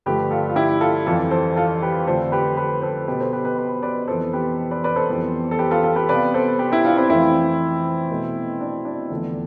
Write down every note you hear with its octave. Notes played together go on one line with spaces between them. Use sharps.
G2 D3 F3 A3 G4 B4
F4 A4
F4
E4 G4
F4 A4
F2 E3 G3 F4 A4
A4 C5
F4 A4
G4 B4
F2 D3 F3 A3 A4 C5
G4 B4
G4 B4
A4 C5
B2 B3 G4 B4
A4 C5
G4 B4
G4 B4
G4 B4
B4 D5
F2 E3 B3 A4 C5
G4 B4
B4 D5
B4 D5
A4 C5
F2 E3 G3 B3
A4
G4 B4
F4 A4
F4 A4
G4 B4
C3 G3 B3 B4 D5
A4 C5
G4 B4
E4 G4
D4 F4
C4 E4
F2 E3 A3 C4 E4
B2 A3
D4
D4
E2 D3 F3 A3